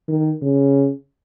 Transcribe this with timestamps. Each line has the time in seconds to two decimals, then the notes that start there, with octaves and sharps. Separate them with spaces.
0.08 D#3
0.42 C#3